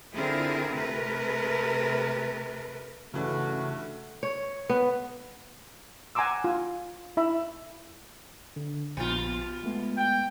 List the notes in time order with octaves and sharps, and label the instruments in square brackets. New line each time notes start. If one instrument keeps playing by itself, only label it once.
[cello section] D3 C4 E4 F4 G#4 A#4
C3 A3 A#4 B4
[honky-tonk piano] G2 E3 [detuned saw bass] C#3 [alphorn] A3 [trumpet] F#4
[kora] C#5
B3
[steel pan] F#5 G#5 A#5 C6 D6 E6
F4
E4 E5 B5
[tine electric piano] D3
[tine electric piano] A#1 B3 [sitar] B2 F4
[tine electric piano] G#3 A3 B3
[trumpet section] G5